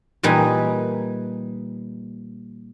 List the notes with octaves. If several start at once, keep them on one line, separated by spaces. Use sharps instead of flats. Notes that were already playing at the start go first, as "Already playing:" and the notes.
A#2 E3 G3 D#4 G#4